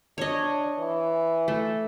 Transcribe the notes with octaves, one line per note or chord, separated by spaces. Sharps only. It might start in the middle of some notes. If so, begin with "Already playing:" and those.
D4 C#5 D#5
E3
A3